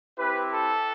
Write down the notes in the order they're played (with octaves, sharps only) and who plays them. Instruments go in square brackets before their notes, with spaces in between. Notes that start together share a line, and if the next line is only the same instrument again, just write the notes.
[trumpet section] C4 E4 G4 B4
A4